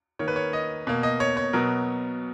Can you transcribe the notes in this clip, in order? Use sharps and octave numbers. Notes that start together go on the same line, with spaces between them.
D#3 A#3 C#5
B4
C#5
D#5
B2 A#3
D#5
C#5
C#5
B2 F#3 B3 A#4